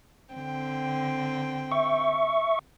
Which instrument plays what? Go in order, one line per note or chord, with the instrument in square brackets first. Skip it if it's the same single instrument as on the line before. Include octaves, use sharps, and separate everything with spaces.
[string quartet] D3 C4 G5
[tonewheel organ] E5 C#6